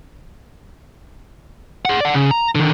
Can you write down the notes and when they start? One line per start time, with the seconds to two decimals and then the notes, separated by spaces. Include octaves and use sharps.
1.85 G#4 F#5
2.01 D5 F#5
2.14 C#3
2.31 A#5
2.55 D3 D#3